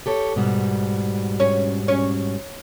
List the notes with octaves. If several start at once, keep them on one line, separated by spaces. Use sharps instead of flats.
G4 A4 C#5
G#2 B2 G3
C#4
C#4